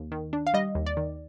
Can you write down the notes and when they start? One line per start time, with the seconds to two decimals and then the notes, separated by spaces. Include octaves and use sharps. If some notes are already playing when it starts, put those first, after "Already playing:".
Already playing: D#2
0.12 D#3
0.33 D4
0.47 F5
0.54 G3 D#5
0.75 D#2
0.86 D5
0.97 D#3